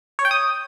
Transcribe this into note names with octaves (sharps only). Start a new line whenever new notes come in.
C#5
G5
D#6